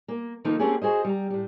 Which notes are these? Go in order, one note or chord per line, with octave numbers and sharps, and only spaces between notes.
A#3
D#3 F3 A3 A#3 D#4
A3 A#3 C4 C#4 G4 G#4
F#4 G#4 C5 D#5
G3 A#5
A2 G3